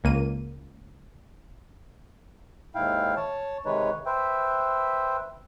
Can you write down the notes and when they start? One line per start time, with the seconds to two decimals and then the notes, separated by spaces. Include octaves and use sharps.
0.04 C#2 A#3 D#7
2.75 D#2 G#2 E4 F5 G5
3.17 C#5 A5
3.66 C3 D#3 G#3 D#4 B4 C#5
4.06 B4 C5 E5 G5